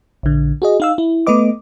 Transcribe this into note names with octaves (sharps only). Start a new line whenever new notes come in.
A#1 D3
F#4 G#4 D#5
D#4 F5 E6
E4
A3 B3 B4 D#5 D6